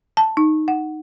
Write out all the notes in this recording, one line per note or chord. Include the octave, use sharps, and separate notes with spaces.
A5
D#4
F#5